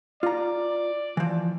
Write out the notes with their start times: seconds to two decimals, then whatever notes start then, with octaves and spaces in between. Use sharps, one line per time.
0.23 F4 D5 A#5
1.17 E3 F3